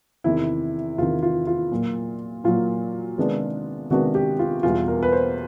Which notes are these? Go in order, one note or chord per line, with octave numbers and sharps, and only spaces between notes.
E2 C3 D#3 E4
E2 C3 D#3 F4
F4
F4
A#2 F#3 A#3
A#2 F#3 A#3 F4
C3 D#3 G#3 B3 D4
C3 D#3 G#3 B3 D4 F#4
G4
F4
E2 B2 G3 F4
A#4
B4
C5